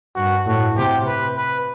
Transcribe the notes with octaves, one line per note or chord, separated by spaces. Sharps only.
G2 F#4
A2 F#4
C3 G4
B4
B4